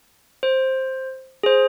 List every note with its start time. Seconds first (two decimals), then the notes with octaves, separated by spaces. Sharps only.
0.43 C5
1.43 G#4 C5